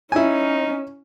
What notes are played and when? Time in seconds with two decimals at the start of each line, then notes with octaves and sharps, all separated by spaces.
0.12 C#4 D#4 E4 G#5